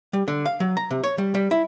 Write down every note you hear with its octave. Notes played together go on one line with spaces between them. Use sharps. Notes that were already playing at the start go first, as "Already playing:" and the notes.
G3
D3
F5
F#3
A#5
C3
C#5
G3
G3
E4